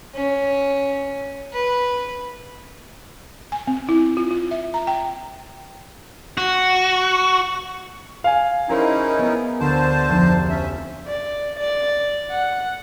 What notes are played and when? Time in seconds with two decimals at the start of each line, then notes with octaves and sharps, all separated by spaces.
0.15 C#4
1.53 B4
3.52 G#5
3.67 C4
3.89 E4
4.17 F4
4.31 F4
4.51 E5
4.74 A#5
4.87 G5
6.37 F#4
8.24 F5 G#5 D7
8.69 C#4 D#4 E4 G#4 A#4 C5
9.19 B3 A#4
9.60 D2 D3 C5 A5
10.09 F1 C6 G6
10.50 C#4 E5
11.07 D5
11.60 D5
12.30 F#5